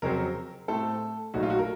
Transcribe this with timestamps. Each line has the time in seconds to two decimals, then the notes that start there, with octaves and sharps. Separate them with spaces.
0.02 F2 C#3 F#3 C4 A#4
0.68 A2 A3 C4 A4
1.34 A#1 A#2 F#3 A3 D#4 F#4
1.43 F4
1.50 F#4
1.59 A#4